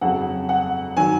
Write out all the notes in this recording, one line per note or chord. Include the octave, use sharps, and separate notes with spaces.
F2 C#3 F#3 F#5
F#5
D#3 F#3 G#5